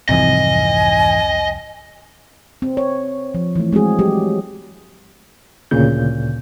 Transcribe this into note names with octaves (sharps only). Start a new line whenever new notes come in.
C2 F2 G#2 E3 D#5 G#5
C4
C#5
F3
E3 A3
G#3 C4 F#4 G#4
F#3 G4
D2 A#2 C#3 G6